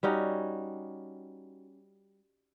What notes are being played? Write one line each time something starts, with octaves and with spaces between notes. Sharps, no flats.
G3 C#4 D#4 F#4